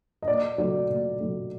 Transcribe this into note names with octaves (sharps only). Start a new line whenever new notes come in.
D#5
A#2 D5
F#3 A3 D5
A#2
F#3 A3